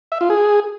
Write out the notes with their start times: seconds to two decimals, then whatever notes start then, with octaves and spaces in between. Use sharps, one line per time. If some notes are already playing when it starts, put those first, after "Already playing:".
0.12 E5
0.21 F4
0.30 G#4